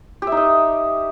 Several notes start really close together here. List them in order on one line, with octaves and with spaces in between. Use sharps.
G4 E5 D#4 D#5